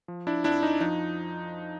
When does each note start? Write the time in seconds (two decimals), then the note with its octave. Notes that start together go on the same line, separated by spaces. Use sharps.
0.08 F3
0.27 D4 E4
0.44 F2 D4 E4
0.63 D#4
0.80 F3 D#4